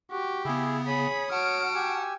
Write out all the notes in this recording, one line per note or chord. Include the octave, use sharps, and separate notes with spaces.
F#4 G4
C#3 B3 E4 G#4
G#4 C#5 B5 D#6
F#4 F#5 A5 F6 D7
G4 G#5 E6